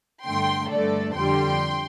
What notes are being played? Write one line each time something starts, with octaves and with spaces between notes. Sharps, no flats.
G2 D3 A3 G5 C6
G2 D3 A3 A4 D5
F2 D3 G3 G5 C6